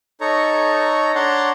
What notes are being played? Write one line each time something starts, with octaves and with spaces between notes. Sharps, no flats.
D#4 A4 C#5 A#5 C#6
D4 C#5 F#5 A5 A#5 C6